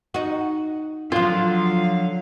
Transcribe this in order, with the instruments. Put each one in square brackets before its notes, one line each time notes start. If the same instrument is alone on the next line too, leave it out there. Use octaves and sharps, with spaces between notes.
[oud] D#4 F#4
[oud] D3 F3 [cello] F#3 F5 [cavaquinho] F4